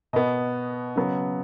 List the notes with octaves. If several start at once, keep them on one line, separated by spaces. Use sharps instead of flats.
B2 B3 D#5
C#3 F#3 B3